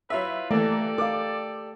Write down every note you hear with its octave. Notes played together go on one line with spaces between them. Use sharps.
F#3 E4 F4 B4 E5
E3 A3 A#3 G4 A4 D5
A#4 F5 D6